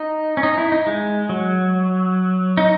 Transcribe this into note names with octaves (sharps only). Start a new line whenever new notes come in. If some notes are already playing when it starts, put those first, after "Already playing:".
Already playing: D#4
C#4
D#4
E4
D#4
G#3
F#3
D#4